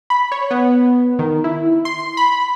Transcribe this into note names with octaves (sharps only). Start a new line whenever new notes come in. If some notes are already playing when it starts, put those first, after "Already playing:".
B5
C#5
B3
D#3
E4
C6
B5